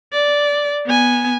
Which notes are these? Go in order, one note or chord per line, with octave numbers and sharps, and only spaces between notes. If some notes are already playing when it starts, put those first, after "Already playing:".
D5
B3 G#5